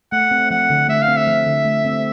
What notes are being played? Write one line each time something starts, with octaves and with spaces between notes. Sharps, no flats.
A3 F#5
C4
F3 F#5
D3
A3 E5
F5
C4
E5
F3
D3
A3
C4